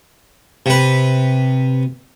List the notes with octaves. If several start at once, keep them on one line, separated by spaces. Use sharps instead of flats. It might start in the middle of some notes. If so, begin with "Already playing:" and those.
C3 B4